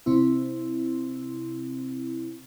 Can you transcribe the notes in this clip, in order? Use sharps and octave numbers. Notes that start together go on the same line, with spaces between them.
C3 C4 E4